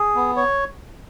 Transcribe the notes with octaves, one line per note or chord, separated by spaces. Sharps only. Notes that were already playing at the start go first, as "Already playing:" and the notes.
Already playing: G#4
B3
C#5